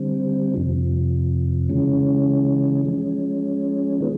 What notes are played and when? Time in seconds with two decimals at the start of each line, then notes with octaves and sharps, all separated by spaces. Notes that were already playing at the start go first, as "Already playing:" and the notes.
Already playing: D3 G3 C4
0.55 F2 C3 F3
1.69 C#3 E3 G#3 C#4
2.85 F3 G#3 C#4
4.01 D#3 G#3 B3